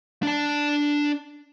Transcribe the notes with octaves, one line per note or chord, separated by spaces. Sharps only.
D4 A5